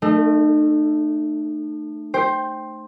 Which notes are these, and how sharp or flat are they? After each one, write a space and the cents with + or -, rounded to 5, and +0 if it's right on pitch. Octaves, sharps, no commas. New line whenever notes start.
A3 +0 D#4 -40
C5 +15 G5 +0